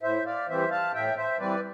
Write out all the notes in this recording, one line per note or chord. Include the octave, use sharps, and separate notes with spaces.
A2 C5 E5
D5 F5
E3 G3 C4 C5 E5
F5 A5
A2 E5 G5
C5 E5
E3 G3 C4 B4 D5